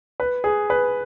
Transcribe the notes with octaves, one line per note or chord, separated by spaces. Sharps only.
B4
G#4
B4